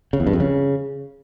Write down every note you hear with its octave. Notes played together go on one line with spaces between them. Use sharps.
C#3
E2
G2
F2
C#3